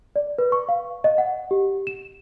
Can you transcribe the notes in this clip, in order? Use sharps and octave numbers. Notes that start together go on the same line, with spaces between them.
D5
B4
C#6
F5
D#5
F#5
G4
E7